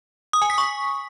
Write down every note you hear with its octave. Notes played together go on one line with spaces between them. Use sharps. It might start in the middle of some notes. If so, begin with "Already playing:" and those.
D#6
G#5
B6
C#6